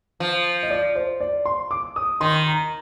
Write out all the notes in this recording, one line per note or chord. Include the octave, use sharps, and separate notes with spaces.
F3
D#5
D5
C5
D5
C6
D6
D#6
D#3 C6
A#5